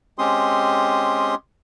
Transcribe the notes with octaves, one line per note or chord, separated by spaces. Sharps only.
G#3 C4 C#4 G4 C6 D#6